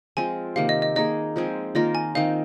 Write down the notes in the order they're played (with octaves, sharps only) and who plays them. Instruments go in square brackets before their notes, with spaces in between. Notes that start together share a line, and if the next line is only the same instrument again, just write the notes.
[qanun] F3 G#3 C4 F4 [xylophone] G#5
[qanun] C3 D#3 A#3 [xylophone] F5
[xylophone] D#5
D#5
[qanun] A#3 D#4 G#4 [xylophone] D#5
[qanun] F3 G#3 C4 G#4
[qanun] D#3 A#3 F4 A#4 [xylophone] D#5
[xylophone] G#5
[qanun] D#3 C4 D#4 [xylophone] F5